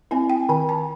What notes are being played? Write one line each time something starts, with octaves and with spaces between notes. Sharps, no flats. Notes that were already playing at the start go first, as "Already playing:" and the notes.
C4 E4 G#5
G5
D#3 G#5
A5